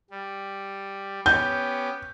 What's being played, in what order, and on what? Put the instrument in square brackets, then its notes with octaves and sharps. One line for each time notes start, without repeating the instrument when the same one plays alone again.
[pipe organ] G3
[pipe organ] B3 C#4 G4 [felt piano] G6